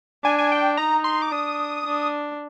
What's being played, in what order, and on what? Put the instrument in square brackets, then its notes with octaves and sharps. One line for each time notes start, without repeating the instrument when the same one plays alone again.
[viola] D4 [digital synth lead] G#5
[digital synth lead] G#5
G5
[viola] D#4 [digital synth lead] A#5
[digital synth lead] C6
D6
[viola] D4 [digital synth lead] D#6
[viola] D4